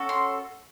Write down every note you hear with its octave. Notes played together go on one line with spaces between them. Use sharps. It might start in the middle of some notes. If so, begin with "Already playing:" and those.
Already playing: C#4 F#4 A4
C6